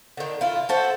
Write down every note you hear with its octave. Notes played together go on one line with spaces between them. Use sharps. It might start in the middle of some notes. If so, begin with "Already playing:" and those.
D3 D#3
E4 F4
F#4 A4 C5